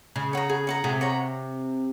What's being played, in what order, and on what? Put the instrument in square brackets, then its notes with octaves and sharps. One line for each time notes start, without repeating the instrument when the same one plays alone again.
[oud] C#3 [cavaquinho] G#4
[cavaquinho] C#5 F#5 A#5
G#4
C#5 F#5 A#5
[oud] C3 [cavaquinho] G#4
[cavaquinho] C#5 F#5 A#5